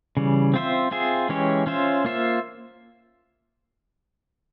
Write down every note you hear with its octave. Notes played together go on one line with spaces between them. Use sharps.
C#3 E3 G3
C4 F4 C5 E5
C4 F4 G#4 E5
E3 G#3 C#4 G4 C#5
C#4 F4 C5 E5
A#3 F4 C5 E5